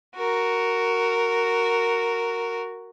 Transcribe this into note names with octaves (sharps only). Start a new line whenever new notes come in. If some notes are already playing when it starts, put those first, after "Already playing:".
F#4 A#4